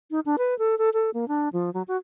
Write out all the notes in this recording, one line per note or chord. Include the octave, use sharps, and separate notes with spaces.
D#4
D4
B4
A4
A4
A4
A#3
D4
F3
F#3
F#4